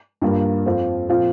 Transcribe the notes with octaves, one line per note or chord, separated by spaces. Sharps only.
G2 G3 A#3 F4
F2 F3 C4 F4
A#2 F3 C4 F4